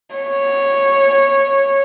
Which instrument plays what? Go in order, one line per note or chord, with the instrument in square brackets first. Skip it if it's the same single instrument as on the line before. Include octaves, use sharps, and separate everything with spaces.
[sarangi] C#5